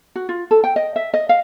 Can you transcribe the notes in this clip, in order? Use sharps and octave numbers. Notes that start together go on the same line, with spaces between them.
F#4
F4
A4
G5
D#5
E5
D#5
F5